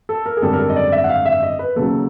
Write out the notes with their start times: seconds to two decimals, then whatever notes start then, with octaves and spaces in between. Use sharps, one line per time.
0.09 A4
0.26 A#4
0.37 G#4
0.42 G#1 F#2 D3 G3 A4
0.53 A#4
0.59 A4
0.69 D#5
0.76 D5
0.92 E5
1.04 F#5
1.09 F5
1.26 E5
1.43 D#5
1.59 B4
1.76 D#2 C#3 F#3 A4